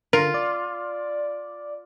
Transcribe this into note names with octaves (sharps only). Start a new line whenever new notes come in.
D3 F4 A#4
D5